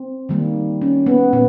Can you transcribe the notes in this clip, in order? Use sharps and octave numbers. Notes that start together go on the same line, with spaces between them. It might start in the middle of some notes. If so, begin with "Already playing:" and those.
Already playing: C4
D#3 G3 A#3
C#4
B3
A#2 B3